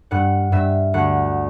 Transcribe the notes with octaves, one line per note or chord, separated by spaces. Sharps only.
G2 F#5
G2 E5
D2 F#5